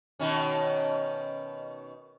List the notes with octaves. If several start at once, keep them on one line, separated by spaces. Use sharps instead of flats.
B2 D#3 C#4